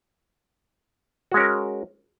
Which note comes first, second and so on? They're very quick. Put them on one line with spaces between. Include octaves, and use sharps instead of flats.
F#4 G#3 C#4 A#4